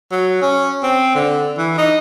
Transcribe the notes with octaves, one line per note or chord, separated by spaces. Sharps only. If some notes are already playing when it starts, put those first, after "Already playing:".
F#3
C#4
C4
D3
E3
D#4